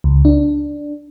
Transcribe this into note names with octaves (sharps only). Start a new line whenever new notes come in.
C#2
D4